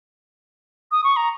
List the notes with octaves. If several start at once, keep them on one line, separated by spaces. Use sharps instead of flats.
D#6
C#6
A#5